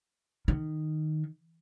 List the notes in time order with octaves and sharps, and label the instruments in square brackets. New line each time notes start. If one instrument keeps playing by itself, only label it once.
[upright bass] D#3